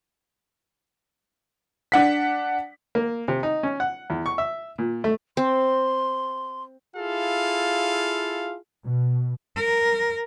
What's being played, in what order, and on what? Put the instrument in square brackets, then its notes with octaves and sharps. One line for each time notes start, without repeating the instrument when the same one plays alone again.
[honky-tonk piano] D4 F#5 B6
[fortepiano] A#3
C3
D#4
C#4
F#5
E2
C#6
E5
A#2
A3
[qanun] C4 [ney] C6
[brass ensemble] E4 F4 G#4 A4 F5
[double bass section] B2
[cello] A#4